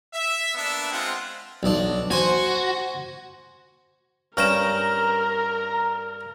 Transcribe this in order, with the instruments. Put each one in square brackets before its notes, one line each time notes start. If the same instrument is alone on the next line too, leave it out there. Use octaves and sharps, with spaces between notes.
[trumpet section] E5
A#3 B3 D4 E5
G#3 C4 F4 F#5
[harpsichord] B1 D4
[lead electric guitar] F#4 [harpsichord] C5 G#5
[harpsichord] G2 C#4 G5 [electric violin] A#4 [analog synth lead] A#5 [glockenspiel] F6 E7